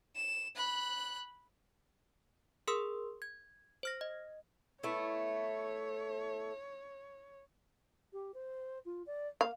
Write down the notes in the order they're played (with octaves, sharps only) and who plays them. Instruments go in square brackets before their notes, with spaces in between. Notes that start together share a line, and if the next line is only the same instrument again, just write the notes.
[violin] E7
B5 F#6
[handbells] G#4 A#4 C6 D#6 E6
G#6
C5 F6 A#6
D#5
[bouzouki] A3 B3 E4 [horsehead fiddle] C#5
[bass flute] G4
C5
F4
D5
[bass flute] A#3 [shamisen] F5